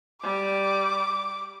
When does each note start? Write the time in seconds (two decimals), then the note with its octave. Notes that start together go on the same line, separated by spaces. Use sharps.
0.23 G3 D6